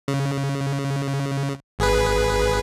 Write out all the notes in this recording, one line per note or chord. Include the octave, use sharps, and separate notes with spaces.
C#3
G#1 G#4 B4